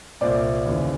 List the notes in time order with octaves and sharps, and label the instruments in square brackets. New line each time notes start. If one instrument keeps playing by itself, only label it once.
[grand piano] C2 A#2 C5 D5
D#2 C#3 E3